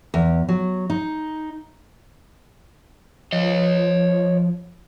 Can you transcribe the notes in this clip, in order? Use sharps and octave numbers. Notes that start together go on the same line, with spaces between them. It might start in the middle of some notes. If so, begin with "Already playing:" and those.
E2
F#3
D#4
F3 C#5 D#5